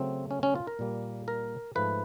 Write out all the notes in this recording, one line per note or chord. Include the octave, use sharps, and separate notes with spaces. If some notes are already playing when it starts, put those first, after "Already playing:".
Already playing: C#3 F#3 A3 C4
C#4
C#4
F4
A#4
A#2 G3 A#3
A#4
G#2 F3 A3 B4